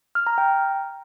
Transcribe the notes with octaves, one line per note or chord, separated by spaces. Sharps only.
F6
A#5
G5